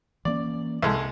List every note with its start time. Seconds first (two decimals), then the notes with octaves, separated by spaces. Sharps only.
0.25 E3 A#3 C#4 D5
0.83 C2 G#3 A4